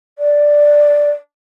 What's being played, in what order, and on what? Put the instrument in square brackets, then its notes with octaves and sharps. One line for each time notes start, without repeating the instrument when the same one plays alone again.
[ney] D5